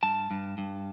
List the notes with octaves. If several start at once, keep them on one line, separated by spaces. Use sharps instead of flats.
G2 A5
G2
G2